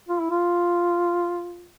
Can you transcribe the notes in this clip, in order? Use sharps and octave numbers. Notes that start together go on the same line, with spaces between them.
F4
E4
F4